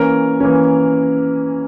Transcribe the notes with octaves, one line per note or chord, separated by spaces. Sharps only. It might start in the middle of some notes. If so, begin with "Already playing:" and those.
Already playing: E3 A#3 C#4 A#4
E3 A#3 C#4